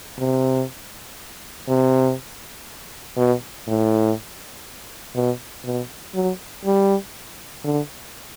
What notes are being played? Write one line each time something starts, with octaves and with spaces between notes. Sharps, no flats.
C3
C3
B2
A2
B2
B2
F#3
G3
D3